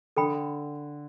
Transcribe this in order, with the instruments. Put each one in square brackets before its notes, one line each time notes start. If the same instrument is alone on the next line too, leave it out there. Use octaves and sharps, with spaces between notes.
[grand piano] D3 [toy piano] A4 G5 B5